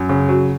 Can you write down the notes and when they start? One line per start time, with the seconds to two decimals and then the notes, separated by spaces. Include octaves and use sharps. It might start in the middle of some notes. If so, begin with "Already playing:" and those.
Already playing: F#2
0.09 C#3
0.29 F#3